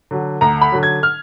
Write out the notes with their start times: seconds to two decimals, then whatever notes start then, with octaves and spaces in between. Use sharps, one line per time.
0.11 D3 F#3
0.41 D2 A#5
0.61 B5
0.72 D3 F#3
0.83 G#6
1.03 F6